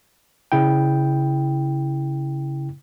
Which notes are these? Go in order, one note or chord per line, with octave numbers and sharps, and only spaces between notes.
C#3 E4 G5